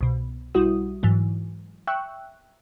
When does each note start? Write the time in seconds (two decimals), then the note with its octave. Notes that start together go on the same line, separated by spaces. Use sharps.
0.01 C2 B2
0.55 B1 G3 E4 F#4 D#6
1.03 G#2 E3 F#3
1.87 E5 G5 C#6 E6 F#6